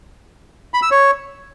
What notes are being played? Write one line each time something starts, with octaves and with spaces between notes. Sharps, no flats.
B5
E6
C#5